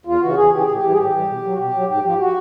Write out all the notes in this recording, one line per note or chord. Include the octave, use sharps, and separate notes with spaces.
E2 F4
C#3 E3 F#4
E2 G#4
C#3 E3 G4
G#4
A2
G4
E3 G3
G#4
A2 G4
E3 G3
B2
F#3
F#4
B2 G4
F#3
G#2 G4
F3 G4
F#4